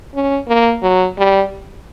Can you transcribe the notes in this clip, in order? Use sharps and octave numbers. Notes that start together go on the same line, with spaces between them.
C#4
A#3
F#3
G3